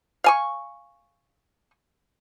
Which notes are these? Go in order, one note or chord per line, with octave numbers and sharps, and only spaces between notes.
F5 G#5 C#6